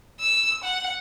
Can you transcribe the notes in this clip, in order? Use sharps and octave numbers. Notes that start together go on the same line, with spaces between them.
E6
F#5